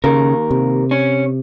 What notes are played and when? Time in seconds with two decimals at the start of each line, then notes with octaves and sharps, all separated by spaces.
0.04 D#2 C#3 A#4
0.51 C3
0.91 C#4